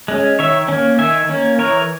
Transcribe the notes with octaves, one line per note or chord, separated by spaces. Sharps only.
G#3 C#4
D#3 C#5 E5
A#3 C#4
D#3 E5 G#5
A#3 C#4
E3 A#4 C#5